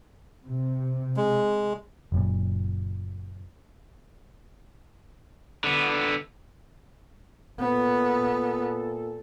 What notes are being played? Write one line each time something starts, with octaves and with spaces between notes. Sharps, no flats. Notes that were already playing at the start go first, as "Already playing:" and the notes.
C3
G#3
F#1 F#2 A#2
D3 B3
A#2 B3 A4